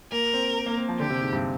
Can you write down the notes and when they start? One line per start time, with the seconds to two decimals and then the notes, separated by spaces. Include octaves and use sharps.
0.12 A#3 A#4
0.34 C4
0.66 A#3
0.78 C4
0.89 F3
1.00 D3 G4
1.10 C3
1.21 G#2
1.32 G2